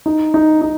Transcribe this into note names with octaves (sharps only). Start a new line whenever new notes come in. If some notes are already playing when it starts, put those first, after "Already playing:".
D#4
D#4
D#4